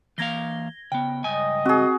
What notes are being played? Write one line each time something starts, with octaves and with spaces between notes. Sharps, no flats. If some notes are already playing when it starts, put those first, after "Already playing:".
E3 A#3 F5 G#6 A#6 G7
C#3 B3 G5
C#2 G2 D#5 G#5
C4 F#4 G#4